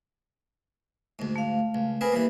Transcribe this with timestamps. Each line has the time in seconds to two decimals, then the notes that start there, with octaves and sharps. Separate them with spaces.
1.19 D2 G#2
1.36 A3 F5
1.75 C#2
2.01 C4 G#4 A#4 B4 B5
2.12 E3 G3 A#3